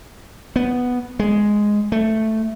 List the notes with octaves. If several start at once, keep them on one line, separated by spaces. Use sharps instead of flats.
B3
G#3
A3